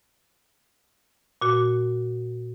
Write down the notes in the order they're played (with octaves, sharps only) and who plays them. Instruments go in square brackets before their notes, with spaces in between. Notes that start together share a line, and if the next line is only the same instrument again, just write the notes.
[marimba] A#2 F#4